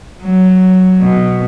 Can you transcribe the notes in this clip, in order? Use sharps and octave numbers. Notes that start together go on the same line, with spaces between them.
F#3
B2